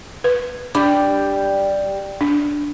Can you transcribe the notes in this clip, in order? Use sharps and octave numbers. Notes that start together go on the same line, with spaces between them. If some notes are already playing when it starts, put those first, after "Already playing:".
B4
G3 D4 D6
D4